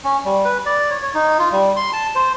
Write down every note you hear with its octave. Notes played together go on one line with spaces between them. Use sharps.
C#4
G3
B4
D5
C#5
C#5
D#4
F4
G3
C6
A5
C5